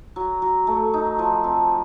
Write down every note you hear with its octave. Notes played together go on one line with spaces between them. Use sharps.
F#3
F#3
A3
D#4
F3
C4